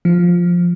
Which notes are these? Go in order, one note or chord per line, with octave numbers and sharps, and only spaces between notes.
F3